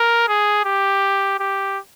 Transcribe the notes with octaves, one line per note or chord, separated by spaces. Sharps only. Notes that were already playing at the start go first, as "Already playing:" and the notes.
Already playing: A#4
G#4
G4
G4